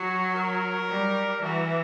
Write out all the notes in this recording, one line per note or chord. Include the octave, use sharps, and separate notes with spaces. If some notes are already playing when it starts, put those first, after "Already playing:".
Already playing: F#3 F#4
A#4
G3
E3 F#4